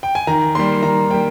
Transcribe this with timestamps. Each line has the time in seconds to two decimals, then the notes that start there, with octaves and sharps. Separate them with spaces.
0.03 G5
0.15 G#5
0.27 D#3 A#5
0.55 G3 A#3 C6
0.83 D#3 A#5
1.11 G3 A#3 G5